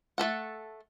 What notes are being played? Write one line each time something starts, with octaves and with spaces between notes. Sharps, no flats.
A3 G#4 A4 F#5